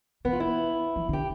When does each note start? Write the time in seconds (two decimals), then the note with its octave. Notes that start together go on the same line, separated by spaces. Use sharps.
0.25 E3 B3
0.33 F4
0.40 E4
0.96 E3
1.09 D3 G4